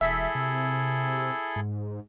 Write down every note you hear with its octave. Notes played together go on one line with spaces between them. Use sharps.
E1 E4 G#4 A4 E5
C3
G#2